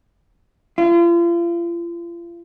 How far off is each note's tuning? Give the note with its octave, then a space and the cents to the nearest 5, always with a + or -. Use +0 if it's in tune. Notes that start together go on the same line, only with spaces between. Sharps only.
F4 -40